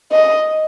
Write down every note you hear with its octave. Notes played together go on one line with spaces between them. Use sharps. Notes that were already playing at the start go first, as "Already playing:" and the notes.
D#5